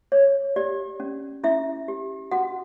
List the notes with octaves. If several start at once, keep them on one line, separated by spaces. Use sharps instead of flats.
C#5
G4 D5
C#4
C#4 E4 E5
G4
F#4 F#5